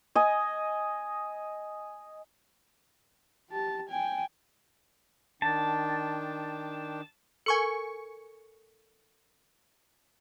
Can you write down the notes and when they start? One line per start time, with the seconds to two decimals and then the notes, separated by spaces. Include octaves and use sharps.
0.16 D#5 G#5
3.50 G4 A5
3.89 G5 G#5
5.42 D#3 D4 G5 A5
7.46 A4 A#4 G#5 C#6 C#7